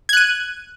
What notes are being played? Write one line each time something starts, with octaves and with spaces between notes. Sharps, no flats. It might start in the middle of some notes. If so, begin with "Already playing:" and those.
F#6 G#6 D#7